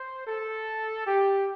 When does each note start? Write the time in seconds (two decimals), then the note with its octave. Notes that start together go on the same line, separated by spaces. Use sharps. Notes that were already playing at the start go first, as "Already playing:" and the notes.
Already playing: C5
0.27 A4
1.07 G4